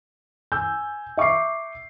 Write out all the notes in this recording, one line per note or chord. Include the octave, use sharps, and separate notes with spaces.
G#5 E6 G6
E5 C#6 D6 C7